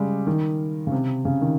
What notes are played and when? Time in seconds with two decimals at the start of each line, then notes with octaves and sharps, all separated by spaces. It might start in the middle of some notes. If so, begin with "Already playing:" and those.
Already playing: C#3 G3 G#3
0.27 D#3
0.87 C#3
0.92 C3
1.25 C#3
1.42 D#3